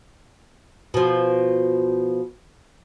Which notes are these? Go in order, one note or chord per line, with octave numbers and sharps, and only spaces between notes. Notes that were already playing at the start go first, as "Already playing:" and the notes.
B2 F3